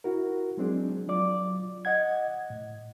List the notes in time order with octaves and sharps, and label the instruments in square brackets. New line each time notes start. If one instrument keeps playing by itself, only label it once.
[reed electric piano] E4 F#4 A#4
F#3 G#3 C4 D4 G#4
F#3 F4 D5 D6
D#5 F#5 G#6
A2